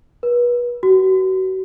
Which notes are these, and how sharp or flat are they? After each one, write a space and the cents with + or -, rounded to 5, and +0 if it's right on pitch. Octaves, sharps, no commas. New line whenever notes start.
B4 -30
F#4 +30